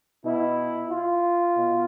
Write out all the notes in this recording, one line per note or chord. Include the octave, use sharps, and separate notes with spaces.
B2 E4
F4
B2